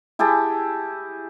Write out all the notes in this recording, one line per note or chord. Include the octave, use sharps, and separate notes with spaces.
E4 G4 G#4 A5